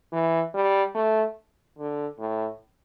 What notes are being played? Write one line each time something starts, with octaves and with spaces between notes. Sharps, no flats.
E3
G3
A3
D3
A2